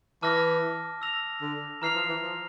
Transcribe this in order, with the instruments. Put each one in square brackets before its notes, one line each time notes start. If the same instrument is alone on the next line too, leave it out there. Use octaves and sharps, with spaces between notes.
[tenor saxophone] E3 [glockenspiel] A5 D6 F6 A#6
[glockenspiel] E6 A#6 F7
[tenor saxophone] D3
[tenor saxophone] E3 [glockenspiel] A#5 F6 C7 F7
[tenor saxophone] F3
E3
F3